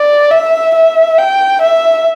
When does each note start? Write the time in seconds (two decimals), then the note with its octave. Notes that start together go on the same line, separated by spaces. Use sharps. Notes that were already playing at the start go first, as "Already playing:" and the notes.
Already playing: D5
0.31 E5
0.75 E5
1.18 G5
1.62 E5